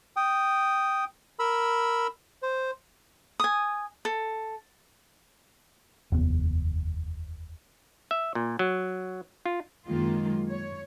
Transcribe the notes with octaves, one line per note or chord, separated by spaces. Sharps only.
G5 D#6
A#4 B5 E6
C5
G#5 D#6
A4
F1 D#2 B3
E5
A#2
F#3
F4
F#2 D#3 G#3 A#3 F4
C#5